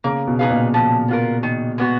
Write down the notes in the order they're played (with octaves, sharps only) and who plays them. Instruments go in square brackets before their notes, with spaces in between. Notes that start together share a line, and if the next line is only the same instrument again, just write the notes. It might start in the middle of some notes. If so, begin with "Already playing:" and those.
[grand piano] C#3 [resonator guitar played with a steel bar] A#3
[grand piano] B2
[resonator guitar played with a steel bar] D#4 G#4 B4 F5
[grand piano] A#2
[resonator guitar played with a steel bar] F3
B3 F4 A#4
D#3
G#3 B3 F#4